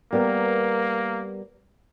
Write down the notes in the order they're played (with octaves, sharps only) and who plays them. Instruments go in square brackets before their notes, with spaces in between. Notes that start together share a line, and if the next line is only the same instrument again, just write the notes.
[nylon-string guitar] G3 B3 A#4 [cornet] A#3